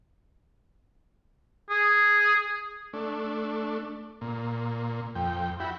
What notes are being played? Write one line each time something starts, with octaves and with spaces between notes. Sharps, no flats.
G#4
A3 D4
A#2
F2 G5
E4 F#4 G5 B5